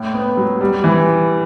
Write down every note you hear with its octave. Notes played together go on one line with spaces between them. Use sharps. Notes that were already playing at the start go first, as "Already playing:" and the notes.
Already playing: A2
B3
F#3
G3
E3